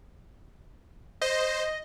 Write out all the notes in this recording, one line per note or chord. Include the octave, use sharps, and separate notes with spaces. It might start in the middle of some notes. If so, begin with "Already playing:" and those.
C5 D#5